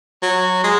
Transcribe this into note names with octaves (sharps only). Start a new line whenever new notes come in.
F#3
G#3